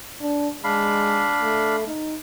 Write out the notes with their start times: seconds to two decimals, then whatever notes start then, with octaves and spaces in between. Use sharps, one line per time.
0.21 D4
0.64 G#3 D4 F5 B5
1.41 A3
1.88 D#4